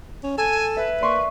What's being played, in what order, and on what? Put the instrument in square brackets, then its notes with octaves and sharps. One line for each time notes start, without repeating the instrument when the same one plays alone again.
[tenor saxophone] C#4
[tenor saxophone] A4 [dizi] G#5
[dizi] B4 [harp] E5
[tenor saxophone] A#3 [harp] D5 C6 C#6